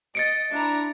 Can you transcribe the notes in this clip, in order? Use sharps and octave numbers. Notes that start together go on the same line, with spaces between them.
D#5 A6 C#7 D7
D4 E4 A#5